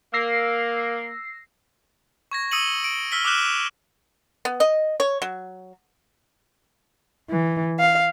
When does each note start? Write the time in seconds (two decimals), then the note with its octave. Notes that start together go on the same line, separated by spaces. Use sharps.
0.14 A#3 E6 A#6 C7
2.31 C#6 G#6 A#6
2.51 D#6 E6 C#7 D#7 F#7
2.84 D7
3.12 E6 F6 B6 G7
3.25 D6 D#6 F6 F#6 E7
4.45 B3
4.60 D#5
5.00 C#5
5.22 F#3
7.30 E3
7.79 F5